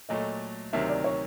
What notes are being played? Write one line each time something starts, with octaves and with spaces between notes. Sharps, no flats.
A#2 F#3 A3 D#5
D2 C3 D#3 F#3 E5
D5
C#5